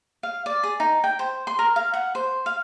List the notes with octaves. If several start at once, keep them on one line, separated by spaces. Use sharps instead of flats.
F5
D5
G#4
D#4
G5
C5
C6
A#4
F5
F#5
C5
F5